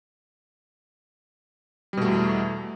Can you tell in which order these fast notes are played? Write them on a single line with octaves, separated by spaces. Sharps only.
G3 B2 A3 E2